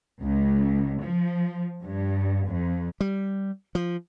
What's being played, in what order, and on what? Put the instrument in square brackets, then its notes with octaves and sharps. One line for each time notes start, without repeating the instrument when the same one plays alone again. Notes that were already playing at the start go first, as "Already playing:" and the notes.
[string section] C#2
F3
G2
F2
[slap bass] G3
F3